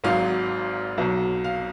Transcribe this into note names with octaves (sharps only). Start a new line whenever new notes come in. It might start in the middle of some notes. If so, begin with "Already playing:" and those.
G#1 G#2 F#3 F5
B1 B2 F#3
F5